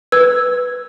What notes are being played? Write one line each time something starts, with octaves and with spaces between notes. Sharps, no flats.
B4 E6 G#6